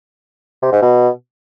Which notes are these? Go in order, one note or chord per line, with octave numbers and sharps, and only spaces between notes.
C3
G#2
B2